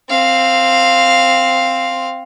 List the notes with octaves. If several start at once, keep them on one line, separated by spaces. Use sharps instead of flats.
C4 F5